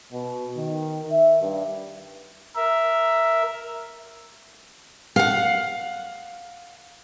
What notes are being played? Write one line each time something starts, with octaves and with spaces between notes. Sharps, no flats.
B2
D#3
E5
G2
A#4 E5
F5 F#5